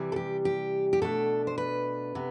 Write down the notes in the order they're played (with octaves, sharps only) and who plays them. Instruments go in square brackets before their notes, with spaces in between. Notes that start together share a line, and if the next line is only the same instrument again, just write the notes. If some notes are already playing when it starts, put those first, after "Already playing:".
Already playing: [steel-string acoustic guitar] C3 E3 G3
A4
G4
G4
G4
B2 A3 D4 A4
C5
B4
C3 B3